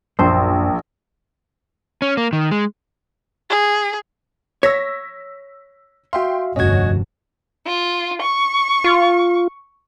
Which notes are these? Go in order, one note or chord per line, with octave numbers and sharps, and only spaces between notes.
A#1 F#2 C5
C#4
A#3
D#3
G#3
G#4
C#5 E6 A#6 B6
F#4 E5 F5 G5 C6
F1 D2 G2 C#4 F#4 D#5 G#6
F4
C#6
F4